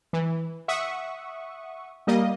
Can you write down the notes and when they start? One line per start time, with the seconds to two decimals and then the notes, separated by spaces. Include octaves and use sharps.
0.13 E3
0.68 E5 F#5 C#6 D#6
2.07 G3 A#3 D#5